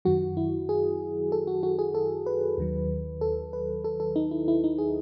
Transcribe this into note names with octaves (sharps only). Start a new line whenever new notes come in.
F#2 D#3 F#3 F#4
E4
G#4
A4
F#4
F#4
G#4
A4
B4
D#2 D#3 F#3
A4
B4
A4
A4
D#4
E4
E4
D#4
G#4